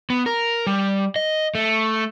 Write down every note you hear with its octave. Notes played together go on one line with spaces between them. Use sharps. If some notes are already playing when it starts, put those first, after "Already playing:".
B3
A#4
G3
D#5
A3